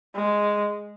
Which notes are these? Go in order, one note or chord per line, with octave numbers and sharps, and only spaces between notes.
G#3